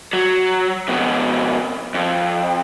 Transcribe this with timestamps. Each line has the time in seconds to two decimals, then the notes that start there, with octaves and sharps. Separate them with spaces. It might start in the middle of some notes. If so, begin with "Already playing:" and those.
0.13 F#3
0.88 F2 B2
1.94 F2